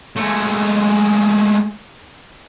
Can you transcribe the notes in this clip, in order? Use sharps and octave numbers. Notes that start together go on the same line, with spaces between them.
G#3 A3